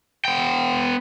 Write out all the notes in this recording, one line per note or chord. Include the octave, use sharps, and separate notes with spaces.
B3 G5